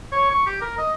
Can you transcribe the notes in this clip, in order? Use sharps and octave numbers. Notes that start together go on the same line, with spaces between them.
C#5
C#6
G4
A#4
D#5